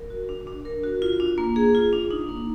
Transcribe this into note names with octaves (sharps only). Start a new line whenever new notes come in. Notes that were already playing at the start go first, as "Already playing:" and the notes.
Already playing: A#4
F#4
D4
D4
A#4
F#4
F4
D4
A#3
G#4
F4
D4
D#4
A#3